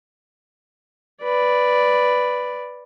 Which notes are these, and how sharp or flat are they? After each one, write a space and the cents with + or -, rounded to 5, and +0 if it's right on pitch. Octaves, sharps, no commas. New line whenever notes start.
B4 +0 D5 +0